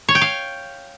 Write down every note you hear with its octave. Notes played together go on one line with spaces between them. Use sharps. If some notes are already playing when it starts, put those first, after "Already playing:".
C#5
G5
F5